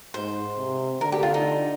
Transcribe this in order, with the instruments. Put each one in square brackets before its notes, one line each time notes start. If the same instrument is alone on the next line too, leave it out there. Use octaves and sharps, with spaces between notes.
[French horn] G#2 [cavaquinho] C5
[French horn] C3
[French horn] D3 [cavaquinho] A#4
[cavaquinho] G4
F4
D#4